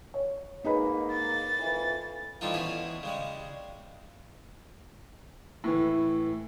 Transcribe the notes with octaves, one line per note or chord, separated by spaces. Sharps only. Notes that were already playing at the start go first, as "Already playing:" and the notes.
C#5
G#2 A#3 D#4 G#4 B4 D#5 B5
A6
F2 E3
E3 F3 G3 A3 D#4 F4
B2 E3 C#4 G#4
C#3 G3 G#3
A2 E3